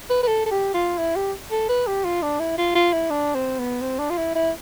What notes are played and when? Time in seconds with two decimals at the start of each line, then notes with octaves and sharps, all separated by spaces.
0.10 B4
0.23 B4
0.27 A4
0.46 A4
0.51 G4
0.74 F4
0.98 E4
1.16 G4
1.51 A4
1.69 B4
1.87 G4
2.04 F4
2.22 D4
2.40 E4
2.58 F4
2.75 F4
2.93 E4
3.10 D4
3.35 C4
3.59 B3
3.81 C4
3.99 D4
4.10 F4
4.17 E4
4.35 E4